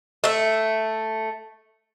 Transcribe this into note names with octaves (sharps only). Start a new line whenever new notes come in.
A3 E5